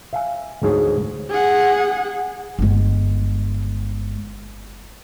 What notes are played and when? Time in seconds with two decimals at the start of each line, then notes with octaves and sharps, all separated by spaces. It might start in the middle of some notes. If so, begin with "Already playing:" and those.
0.13 E5 F5 G#5
0.63 D2 G#2 G#4 C#5
1.30 G#4 F#5
2.59 G1 G#3